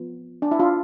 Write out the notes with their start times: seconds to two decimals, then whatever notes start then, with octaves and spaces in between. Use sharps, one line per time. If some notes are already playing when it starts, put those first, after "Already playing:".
Already playing: F3 B3
0.42 D4
0.51 E4
0.60 D4 F4